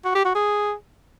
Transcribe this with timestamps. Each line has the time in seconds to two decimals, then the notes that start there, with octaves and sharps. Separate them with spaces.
0.05 F#4
0.15 G4
0.25 F#4
0.35 G#4